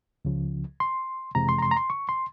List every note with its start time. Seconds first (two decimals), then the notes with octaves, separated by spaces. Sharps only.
0.25 C#2 C#3 F3
0.80 C6
1.35 F2 C3 E3 G#3 A#5
1.49 C6
1.59 A#5
1.62 C6
1.71 A#5
1.77 C6
1.90 C#6
2.09 C6